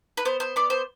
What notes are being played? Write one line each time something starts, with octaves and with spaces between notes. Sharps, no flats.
B4
B3 C5
C5
B3 D5
C5